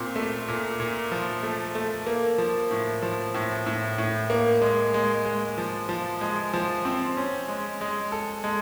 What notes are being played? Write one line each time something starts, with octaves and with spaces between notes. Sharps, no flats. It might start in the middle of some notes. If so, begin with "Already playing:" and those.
Already playing: A#2 C4
A3
A#2
A#2
F3
A3
A3
A#3
F3
A2
F3
A2
A2
A2
A#3
G#3
G#3
G#3
F3
F3
G#3
F3
C4
C#4
G#3
G#3
A4
G#3